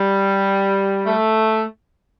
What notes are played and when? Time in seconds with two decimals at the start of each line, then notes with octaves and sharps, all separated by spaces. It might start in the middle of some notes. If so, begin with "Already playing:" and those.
Already playing: G3
1.06 A3